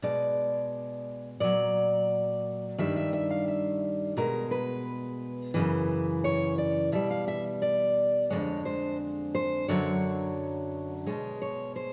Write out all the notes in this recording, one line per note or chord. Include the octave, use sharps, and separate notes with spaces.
B2 G#3 D5
A#2 F#3 D5
G2 D#3 G3 E5
E5
E5
F5
E5
B2 G#3 A#4
B4
F#2 C#3 E3
C#5
D5
B2 G3 E5
F5
E5
D5
F2 D3 F3 G#3 C#5
C5
C5
F#2 D3 F#3 C#5
B2 G#3 C#5
C#5
C5